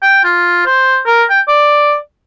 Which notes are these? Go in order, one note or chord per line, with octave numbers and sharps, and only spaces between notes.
G5
F4
C5
A#4
G5
D5